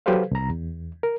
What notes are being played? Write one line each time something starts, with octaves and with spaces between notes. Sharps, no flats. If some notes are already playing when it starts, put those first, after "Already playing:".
F#3 G4 A4 B4 C5 F5
C2 A#5
E2
A#4